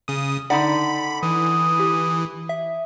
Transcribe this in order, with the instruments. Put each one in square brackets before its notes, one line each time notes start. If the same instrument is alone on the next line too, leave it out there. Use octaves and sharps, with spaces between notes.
[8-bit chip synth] C#3 D#6
[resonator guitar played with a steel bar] D3 D#4 D5 [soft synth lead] F#5 [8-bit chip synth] B5
[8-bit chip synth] E3 [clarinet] D#6
[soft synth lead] G4
E5